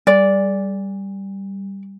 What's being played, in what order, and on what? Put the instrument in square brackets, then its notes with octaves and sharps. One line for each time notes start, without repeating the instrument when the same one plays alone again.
[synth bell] G3 [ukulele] D5